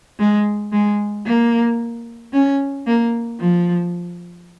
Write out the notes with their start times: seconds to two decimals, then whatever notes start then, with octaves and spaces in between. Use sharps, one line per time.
0.19 G#3
0.72 G#3
1.26 A#3
2.33 C#4
2.87 A#3
3.40 F3